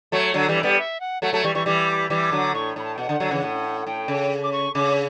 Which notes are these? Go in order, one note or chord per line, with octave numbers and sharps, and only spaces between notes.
F#3 A3 C#5
D3 F#3
E3 G3
D5
G3 B3
E5
F#5
F#3 A3 F#5
F#3 A3 A5
E3 G3 C#6
E3 G3 C#6
E3 G3 D6
E3 G3 D6
D3 F#3
A2 C#6
A2 B5
A5
G5
B2 F#5
D3
D3 F#3
C#3 E3
A2
F#5
A2 G5
C#3
D6
C#6
C#3 D6